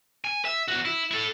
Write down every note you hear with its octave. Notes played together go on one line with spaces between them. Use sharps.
G#5
E5
E2 F#4
E4
E4 A4